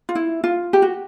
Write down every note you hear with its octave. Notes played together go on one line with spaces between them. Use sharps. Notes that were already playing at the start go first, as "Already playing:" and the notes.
F4
E4
F4
G4
F#4